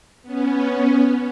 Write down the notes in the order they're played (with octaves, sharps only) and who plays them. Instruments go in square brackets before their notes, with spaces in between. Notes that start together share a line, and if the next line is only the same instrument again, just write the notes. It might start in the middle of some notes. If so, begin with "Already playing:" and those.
[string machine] B3 C#4